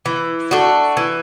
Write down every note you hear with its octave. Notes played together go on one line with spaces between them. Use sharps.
E3
A3 D4 F#4
E3